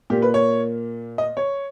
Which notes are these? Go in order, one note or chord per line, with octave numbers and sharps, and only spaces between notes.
A#2 A#3 G4
B4
C#5
D#5
C#5